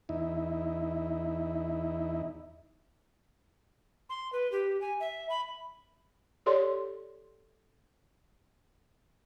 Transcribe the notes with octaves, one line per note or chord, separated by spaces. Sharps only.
E2 D#4 E4
C6
B4
G4
G#5
E5
B5
G4 A4 C#5 D5 C6